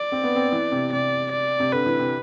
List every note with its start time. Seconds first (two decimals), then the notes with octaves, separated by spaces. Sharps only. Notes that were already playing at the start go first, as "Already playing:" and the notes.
Already playing: D5
0.12 C4
0.23 B3
0.36 C4
0.52 E3
0.72 C3
0.92 C3 D5
1.32 D5
1.60 C3
1.72 D3 B4
1.86 E3
1.99 C3